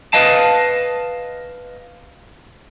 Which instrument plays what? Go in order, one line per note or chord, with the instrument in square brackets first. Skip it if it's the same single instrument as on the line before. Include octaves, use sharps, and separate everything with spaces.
[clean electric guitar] B4 D#5 F5 A5